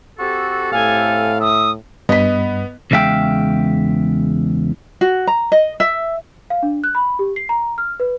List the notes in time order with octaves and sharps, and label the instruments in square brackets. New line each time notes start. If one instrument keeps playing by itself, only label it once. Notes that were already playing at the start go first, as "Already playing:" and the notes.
[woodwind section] C4 G4 A4 [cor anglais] F#4
[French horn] A2 [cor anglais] F5 [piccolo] G#5
[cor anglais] E5 [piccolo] D#6
[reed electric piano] G2 [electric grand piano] B3 [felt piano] D#5 B6
[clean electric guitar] E2 C#3 G#3 E5 F5 G5
[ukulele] F#4
A#5
D#5
E5
[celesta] F5
D4
F#6
B5
G4
C7
A#5
F6
B4